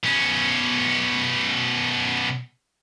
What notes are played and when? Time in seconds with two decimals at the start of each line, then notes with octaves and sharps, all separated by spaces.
0.04 B2 C#4